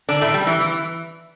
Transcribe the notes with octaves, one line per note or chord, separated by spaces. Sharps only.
D3 D4
A2 A3
G3
E3
E3